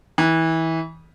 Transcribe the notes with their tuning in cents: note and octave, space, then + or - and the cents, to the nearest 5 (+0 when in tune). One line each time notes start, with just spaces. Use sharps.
E3 -25